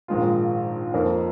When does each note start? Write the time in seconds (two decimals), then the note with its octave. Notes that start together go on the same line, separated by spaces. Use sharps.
0.08 A#1 G#2 D#3 G#3 F4
0.94 F2 F3 A#3 D#4 A#4